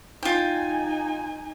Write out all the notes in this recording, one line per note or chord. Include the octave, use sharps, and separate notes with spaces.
D#4 F4 G5 G#5